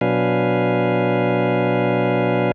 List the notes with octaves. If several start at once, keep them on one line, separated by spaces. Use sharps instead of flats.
B2 F#3 D4 B4 F5 G#5